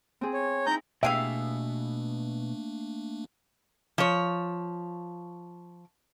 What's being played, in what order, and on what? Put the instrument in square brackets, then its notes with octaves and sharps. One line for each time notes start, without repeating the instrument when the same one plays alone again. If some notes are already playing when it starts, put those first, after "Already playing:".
[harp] C4 G#4
[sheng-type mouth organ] C#5
[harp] D#4 E4 [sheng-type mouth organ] A#5 G6
[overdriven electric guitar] B2 [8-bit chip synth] A3 A#3 D4 [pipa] G4 G#4 F5 [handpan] E5
[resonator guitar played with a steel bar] F3 C#5